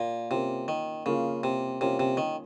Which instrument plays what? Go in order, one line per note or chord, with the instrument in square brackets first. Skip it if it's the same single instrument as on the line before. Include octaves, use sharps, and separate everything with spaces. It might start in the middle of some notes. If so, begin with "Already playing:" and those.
Already playing: [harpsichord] A#2 [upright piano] A#3
[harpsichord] C3 [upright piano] A#3 C#4 F4
[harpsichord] D#3
[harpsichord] C#3 [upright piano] A#3 C#4 F4
[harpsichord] C3
[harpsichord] C3 [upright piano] A#3 C#4 F4
[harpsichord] C3
D#3